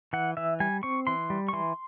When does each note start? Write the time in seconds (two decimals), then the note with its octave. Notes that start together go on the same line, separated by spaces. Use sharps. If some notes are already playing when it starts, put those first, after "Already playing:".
0.13 E3 F#5
0.37 E3 E5
0.60 G3 G#5
0.83 C4 C#6
1.07 E3 C6
1.30 G3
1.48 C#6
1.53 E3 C6